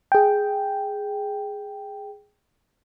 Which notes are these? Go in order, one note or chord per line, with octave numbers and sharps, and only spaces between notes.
G#4 G5